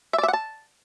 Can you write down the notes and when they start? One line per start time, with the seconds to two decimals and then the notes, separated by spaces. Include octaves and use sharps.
0.13 E5
0.18 D5
0.23 E5
0.28 F#5
0.33 A5